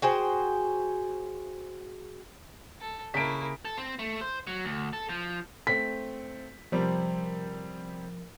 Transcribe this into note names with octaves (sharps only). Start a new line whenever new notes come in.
F#4 G#4 C5 G5
A4
C#3 A#3 E4 B6 D7
A4
C4
A3
C5
F#3
D2
A4
F3
A3 C4 B6
C3 F3 G3 C4 A#4